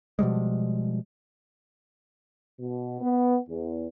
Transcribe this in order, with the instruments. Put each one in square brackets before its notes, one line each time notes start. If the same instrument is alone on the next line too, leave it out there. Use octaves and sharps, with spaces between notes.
[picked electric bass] B2 F3 G3 G#3
[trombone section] B2
B3
E2